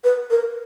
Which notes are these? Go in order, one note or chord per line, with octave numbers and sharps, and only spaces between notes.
B4
A#4